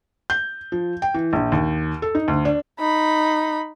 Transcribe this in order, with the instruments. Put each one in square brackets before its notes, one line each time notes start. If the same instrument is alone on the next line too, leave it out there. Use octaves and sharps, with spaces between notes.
[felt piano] G6
F3
G5
E3
A#1
D#2
A4
D#4
D2
D4
[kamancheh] D#4 B5